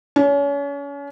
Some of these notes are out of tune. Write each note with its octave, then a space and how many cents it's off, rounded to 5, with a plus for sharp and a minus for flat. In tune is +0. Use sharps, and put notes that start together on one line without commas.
C#4 +35